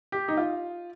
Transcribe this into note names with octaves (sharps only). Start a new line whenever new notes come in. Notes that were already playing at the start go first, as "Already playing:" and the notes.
G4
D#4
F4